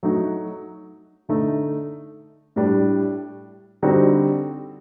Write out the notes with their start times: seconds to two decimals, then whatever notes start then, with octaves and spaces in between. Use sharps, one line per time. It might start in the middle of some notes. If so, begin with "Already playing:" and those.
0.03 F#3 A3 D#4 F#4
1.29 D3 A3 D#4
2.56 A2 G3 D4
3.82 D3 G3 C4 D#4 F#4